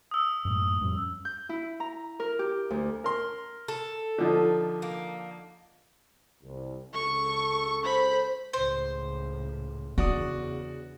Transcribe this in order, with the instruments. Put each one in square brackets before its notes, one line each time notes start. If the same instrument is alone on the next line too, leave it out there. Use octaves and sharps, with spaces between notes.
[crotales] D#6 E6
[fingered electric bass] F#2 A2
F2 G3 C#4
[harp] G6
E4
A#5
A#4
G4
D2
[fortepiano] A#4 C6
[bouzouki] A4
[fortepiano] D3 F3 D#4
[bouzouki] A#3
[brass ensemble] C2
[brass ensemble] C#2 A4 [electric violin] C#6
[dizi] C5 [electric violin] B5
[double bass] C#2 A2 [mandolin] C5
[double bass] E2 C#3 [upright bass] D4 [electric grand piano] F#4 D5 D#6